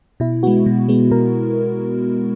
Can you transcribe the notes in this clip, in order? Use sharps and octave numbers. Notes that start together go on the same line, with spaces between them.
B2 E4
G#3 B3 F#4
B2
G#3 B3
B2 A#4